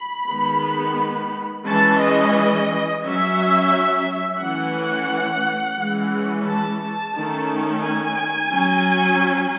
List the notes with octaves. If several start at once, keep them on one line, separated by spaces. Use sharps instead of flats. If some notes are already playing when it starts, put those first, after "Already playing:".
Already playing: B5
D#3 G#3 B3
E3 G#3 C#4 A5
D#5
F#3 C#4 E5
E3 A3 C#4 F#5
E3 G#3 C#4
A5
D#3 A3 C#4
G#5
G#5
F#3 C#4